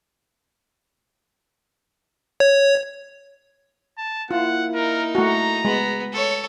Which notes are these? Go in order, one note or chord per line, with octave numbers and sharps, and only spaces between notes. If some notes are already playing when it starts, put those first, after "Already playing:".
C#5
A5
A#3 E4 F4 F#5
D#4 A#4
A3 F#4 A#5
G#3 B3
A4 C#5